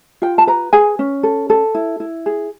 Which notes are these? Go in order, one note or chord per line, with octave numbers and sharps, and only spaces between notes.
F4 G5
A5
B4 A#5
G#4 G#5
C#4
A4
A4
E4
E4
G#4